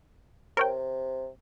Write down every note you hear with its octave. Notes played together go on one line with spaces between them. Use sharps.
C3 A#4 C#5 G5